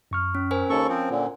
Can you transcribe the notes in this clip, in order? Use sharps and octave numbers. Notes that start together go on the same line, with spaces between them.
F#2 C#6 F6
C#4
A#4 C5 G#5
D#2 C#4 A4 C#5 C#6
F3 C4
A#2 D3